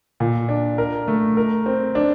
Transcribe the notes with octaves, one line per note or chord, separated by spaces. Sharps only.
A#2
D4
A#4
A3
A#4
C4
D4